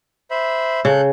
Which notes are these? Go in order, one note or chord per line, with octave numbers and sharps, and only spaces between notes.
C5 E5 B5
C#3 A4 F#6 G6